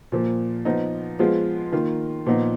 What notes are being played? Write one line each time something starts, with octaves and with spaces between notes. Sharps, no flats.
A#2 F3 A#3
F3 B3 D#4
F3 G#3 B3 F4 G#4
D#3 A#3 F4
A#2 F3 B3 D#4